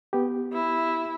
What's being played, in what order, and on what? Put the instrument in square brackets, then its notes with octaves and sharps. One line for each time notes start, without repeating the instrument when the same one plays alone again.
[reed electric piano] B3 G4
[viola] E4